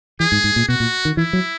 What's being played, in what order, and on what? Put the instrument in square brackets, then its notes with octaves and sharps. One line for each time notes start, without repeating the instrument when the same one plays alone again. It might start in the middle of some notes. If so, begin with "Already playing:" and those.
[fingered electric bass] E3 [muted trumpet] G#4
[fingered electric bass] G#2
G#2
A#2
[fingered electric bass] B2 [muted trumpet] F#4
[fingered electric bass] A#2
D#3
[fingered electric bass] E3 [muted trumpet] E4
[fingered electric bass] F#3